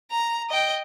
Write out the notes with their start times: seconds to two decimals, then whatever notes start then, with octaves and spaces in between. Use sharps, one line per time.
0.11 A#5
0.50 D#5 G5